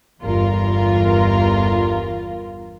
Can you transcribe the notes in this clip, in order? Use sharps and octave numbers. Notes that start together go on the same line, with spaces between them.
G1 E2 F4 A#4